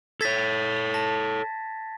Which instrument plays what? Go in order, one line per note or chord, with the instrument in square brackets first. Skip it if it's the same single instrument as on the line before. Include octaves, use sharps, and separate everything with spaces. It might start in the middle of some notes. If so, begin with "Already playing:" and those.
[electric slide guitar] A4 C#5 [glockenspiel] G#6 A6 B6
[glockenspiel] A5 A#6